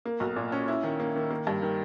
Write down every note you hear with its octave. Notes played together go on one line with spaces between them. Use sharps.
A#3
B1
A#2
C#4
E4
D#3
A#3
D#3
A#3
G2
D#3